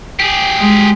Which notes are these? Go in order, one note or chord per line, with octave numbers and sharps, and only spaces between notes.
G4 G#4
G#3